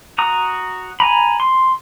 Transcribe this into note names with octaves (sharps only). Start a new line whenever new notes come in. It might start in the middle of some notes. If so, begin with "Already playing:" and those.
F#4 A#5 D#6
G#5 A#5 B5
C6